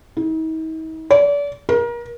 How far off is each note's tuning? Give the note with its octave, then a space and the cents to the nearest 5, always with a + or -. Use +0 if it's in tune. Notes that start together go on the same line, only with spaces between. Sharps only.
D#4 +45
D5 -35
A#4 +30